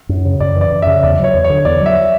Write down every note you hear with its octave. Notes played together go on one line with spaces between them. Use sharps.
F#2
C#3
F#2 D5
E3 D5
F#2
E5
C#3
E2 D5
F#3 C#5
E2
C#5
D3
E2 D5
F#3 E5